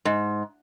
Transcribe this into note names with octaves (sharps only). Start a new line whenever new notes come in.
G#2